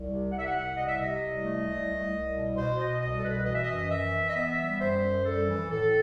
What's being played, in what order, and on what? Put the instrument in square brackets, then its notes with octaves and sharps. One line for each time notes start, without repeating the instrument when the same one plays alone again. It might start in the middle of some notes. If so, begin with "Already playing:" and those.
Already playing: [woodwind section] C2
C3
C2 F#5
E5
F#5
C2
C3 D#5
E5
C3 D#5
C2
A3
C2
C2
C2
B2
B2 C5
B2 D#5
C2 D#5
A4
B2 B4
E3 D#5
E5
F#2 D#5
E3 E5
E3
D#5
B3 E5
G3
F#2 C5
F#2
G3 A4
E3
A2 A4